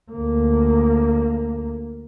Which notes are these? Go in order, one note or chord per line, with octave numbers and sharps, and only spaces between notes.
D2 A#3